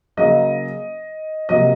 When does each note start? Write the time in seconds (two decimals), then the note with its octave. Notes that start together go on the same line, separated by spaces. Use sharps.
0.17 C#3 F#3 A#3 D#5
1.49 C3 F#3 A#3 D#5